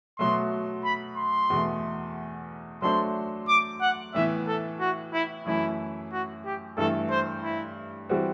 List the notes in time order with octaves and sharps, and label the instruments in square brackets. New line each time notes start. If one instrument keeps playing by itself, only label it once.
[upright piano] B2 F#3 A3 [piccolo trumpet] C6
[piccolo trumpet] B5
C6
[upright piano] E2 B2 A3
[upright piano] F#3 A3 D4 A4 C5 [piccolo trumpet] C6
[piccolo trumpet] D6
F#5
[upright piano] A2 E3 B3 [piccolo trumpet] E5
[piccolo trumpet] A4
F#4
E4
[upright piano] F#2 E3 A3 [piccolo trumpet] E4
[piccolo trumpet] F#4
G4
[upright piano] G2 E3 A3 [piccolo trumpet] A4
[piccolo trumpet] C5
E4
[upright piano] E3 G3 C4 F#4